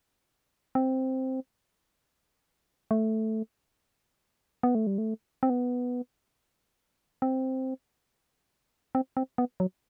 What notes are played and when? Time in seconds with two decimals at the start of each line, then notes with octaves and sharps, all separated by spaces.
0.75 C4
2.91 A3
4.63 B3
4.75 A3
4.87 G3
4.98 A3
5.43 C4
5.50 B3
7.22 C4
8.95 C4
9.17 C4
9.38 B3
9.60 F#3